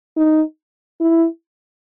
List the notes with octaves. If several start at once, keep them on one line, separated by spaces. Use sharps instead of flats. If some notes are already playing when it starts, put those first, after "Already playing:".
D#4
E4